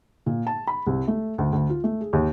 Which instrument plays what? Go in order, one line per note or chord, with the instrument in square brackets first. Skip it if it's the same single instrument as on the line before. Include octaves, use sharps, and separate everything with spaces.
[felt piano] A#2
A5
B5
C2
A3
D2
D2
F4
A3
G#4
D#2